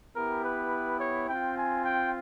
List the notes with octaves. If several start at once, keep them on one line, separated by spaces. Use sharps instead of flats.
B3 E4 G4 A#4
B4
C#5
C4 F4 G5
G#5
G5